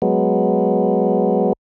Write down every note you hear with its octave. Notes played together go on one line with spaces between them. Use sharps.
F#3 G#3 B3